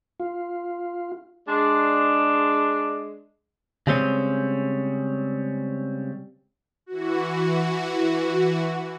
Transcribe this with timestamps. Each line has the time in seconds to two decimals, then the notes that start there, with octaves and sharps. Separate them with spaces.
0.20 F4
1.47 G#3 D4
3.87 C#3 G3 G#3 C4 C#4
6.86 E3 F#4